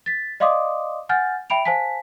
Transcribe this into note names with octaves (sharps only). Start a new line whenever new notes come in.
A6 B6
D5 D#5 F5 C6 D6 D#6
F#5 G#5 F6 G6 A6
E5 G5 B5 D7 F7
C5 F5 G#5 A5 B6